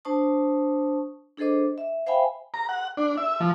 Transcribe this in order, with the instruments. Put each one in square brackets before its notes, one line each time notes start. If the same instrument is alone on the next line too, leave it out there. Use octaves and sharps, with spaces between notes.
[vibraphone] D4 C5 A5 C#6 D#6
D4 G#4 A4 C5 D#5 D6
E5
C5 E5 F5 G5 G#5 B5
[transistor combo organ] A#5
F#5
D4
E5
F3